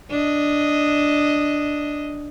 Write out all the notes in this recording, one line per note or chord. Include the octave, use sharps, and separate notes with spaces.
D4 D#5